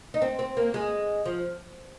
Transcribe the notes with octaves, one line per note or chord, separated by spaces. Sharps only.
D#4
C4
C4
A#3
G#3
F3